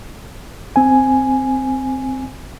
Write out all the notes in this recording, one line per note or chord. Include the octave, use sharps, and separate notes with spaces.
C4 G#5